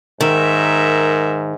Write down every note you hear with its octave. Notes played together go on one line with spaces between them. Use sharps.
G#2 D#3 A#4 E5